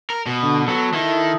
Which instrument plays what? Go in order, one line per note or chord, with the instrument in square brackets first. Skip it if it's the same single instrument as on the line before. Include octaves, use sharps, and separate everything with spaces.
[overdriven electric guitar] A#4
B2
[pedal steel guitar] D3
[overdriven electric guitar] F#3 [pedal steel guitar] B3 A4
[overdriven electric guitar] D#3 [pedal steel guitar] E4 A4